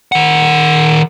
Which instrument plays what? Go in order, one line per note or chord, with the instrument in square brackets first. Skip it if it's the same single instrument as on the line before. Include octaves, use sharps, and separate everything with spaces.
[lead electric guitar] D#3 F#5